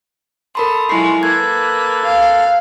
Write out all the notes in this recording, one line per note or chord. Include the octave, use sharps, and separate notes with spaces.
A4 A#4 B5 C6 D#6
F#3 G#3 E4 F4 B5 C#6 C7
A#3 A4 B4 F#6 G#6
F5